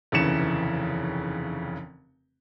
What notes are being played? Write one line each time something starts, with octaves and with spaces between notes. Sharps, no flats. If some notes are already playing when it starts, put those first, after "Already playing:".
F1 D#2 C#3 E3 C#7 E7